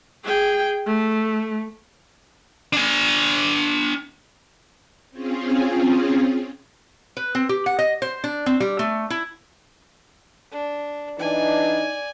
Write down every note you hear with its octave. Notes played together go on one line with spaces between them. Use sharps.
G#4 G5
A3
D4 G#5
C4 C#4 F4 G#4
B4
C4
G4
F#5
D#5
C5
D4
C4
G3
A3
E4
D4
E3 D4 D#4 D5 G#5